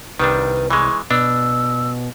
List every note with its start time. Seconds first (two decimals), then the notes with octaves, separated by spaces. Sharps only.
0.20 C2 D#3 G3 D4 B4
0.70 E3 G#3 C#6
1.11 B2 D4 E6